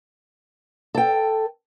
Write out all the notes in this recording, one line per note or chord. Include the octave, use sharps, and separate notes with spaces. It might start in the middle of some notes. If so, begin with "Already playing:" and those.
A4 G5